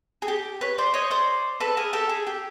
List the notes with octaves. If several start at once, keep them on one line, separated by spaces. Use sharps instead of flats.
G#4
G4
B4 C#5
C5 D5
C#5 D#5
C5 D5
A4 B4
G#4 A#4
G4 A4
G#4
G4